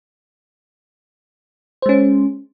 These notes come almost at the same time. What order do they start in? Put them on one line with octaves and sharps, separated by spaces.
C5 G#3 C#4